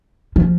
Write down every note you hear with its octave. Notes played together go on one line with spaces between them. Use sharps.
F3